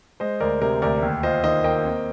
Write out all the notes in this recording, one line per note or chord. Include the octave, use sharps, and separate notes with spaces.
G#3 C5 D#5
D2 A#4 D5
C3 A#4
D2 A#4 D5
D#2
F4 C5 D#5
D#3 C5 D#5
A#3 D#5 G5
C4